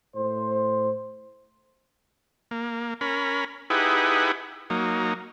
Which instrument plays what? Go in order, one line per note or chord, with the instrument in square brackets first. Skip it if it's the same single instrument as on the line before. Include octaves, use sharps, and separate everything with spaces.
[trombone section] A2 C5
[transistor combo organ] A#3
C#4 A#4 B5
D#4 E4 G4 G#4 B4 F#5
F#3 A#3 D#4